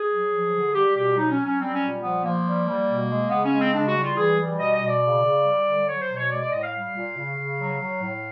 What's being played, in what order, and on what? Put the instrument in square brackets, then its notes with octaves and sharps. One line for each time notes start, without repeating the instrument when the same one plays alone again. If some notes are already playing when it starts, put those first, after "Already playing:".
Already playing: [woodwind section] G#4
F#3
F3
D3
G3 G4
B2 G4
F#3 D#4
C#4
F#3
C#4
G3 C4
C#4
A#2
F3 B3
F3 A#3
G3
G3
B2
G#3
C#3 B3
C#4
G#3
C4
C#3 D4
F#4
G3
F4
E3 G#4
G3
B2 D#5
D#5
B2
D5
C#3
C#3
G3
D3
F#3 C#5
C5
B2
C#5
G#3 D5
D5
A2 D#5
F5
G3 F5
A#2
C#3
C#3
F#3
F#3
A2